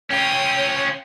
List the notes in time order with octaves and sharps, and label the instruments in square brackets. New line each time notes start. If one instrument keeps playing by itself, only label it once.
[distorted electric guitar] C#4 F4 [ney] C#5 [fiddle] G5 D#6